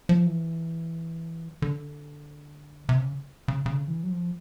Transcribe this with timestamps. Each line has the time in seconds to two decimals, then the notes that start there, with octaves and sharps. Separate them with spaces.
0.09 F3
0.27 E3
1.62 D3
2.89 C3
2.98 C#3
3.48 C#3
3.66 C#3
3.72 D3
3.80 C#3
3.88 E3
4.03 F#3
4.11 F3